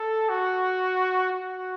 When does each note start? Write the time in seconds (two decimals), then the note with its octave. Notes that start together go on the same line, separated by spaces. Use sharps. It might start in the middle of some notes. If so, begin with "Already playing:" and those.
Already playing: A4
0.29 F#4
1.32 F#4